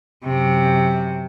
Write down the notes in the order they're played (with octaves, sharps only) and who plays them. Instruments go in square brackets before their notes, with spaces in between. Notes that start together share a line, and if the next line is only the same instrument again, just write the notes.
[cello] F#2 C3